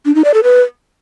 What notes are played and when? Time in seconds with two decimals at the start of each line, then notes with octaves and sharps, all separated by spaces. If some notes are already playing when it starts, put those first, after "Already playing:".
0.06 D4
0.15 D#4
0.25 D5
0.34 A4
0.43 B4